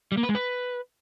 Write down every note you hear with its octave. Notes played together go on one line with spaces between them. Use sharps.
G3
A#3
B4
G#3
B4